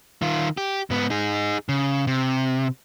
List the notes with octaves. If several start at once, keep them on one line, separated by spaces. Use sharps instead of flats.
D#3 F4
G4
G#2 B3
D#4 G#4
C#3
C3